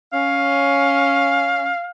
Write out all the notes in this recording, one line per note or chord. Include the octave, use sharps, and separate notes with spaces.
C#4 F5